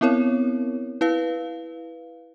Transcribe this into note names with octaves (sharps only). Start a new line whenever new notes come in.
B3 C4 E4 A#4 C#5
E4 B4 F5